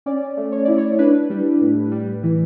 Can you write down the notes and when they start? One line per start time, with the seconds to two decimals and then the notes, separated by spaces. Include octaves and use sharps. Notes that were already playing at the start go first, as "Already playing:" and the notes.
0.06 C#4 D5
0.37 A3
0.52 C#5
0.65 E4 D5
0.78 C#5
0.99 D4 B4
1.30 G3
1.61 A2
1.92 G3
2.23 E3